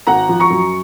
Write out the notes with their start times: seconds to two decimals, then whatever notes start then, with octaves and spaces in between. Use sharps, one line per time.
0.07 G#1 F#5 A#5
0.29 F3
0.40 A#5 C#6
0.51 F#2